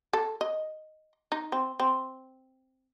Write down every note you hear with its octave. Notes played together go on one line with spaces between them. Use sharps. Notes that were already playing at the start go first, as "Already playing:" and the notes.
A4
D#5
D#4
C4
C4